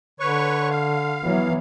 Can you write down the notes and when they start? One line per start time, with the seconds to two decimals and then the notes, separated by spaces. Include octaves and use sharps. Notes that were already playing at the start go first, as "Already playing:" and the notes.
0.20 D3 B4 C#5 C#6
0.70 F5
1.23 E3 F#3 B3